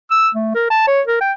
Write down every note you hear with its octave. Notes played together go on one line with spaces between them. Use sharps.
E6
A3
A#4
A5
C#5
A#4
G5